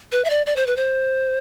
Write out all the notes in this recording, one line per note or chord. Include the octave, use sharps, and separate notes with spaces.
B4
E5
D5
D5
C5
B4
C5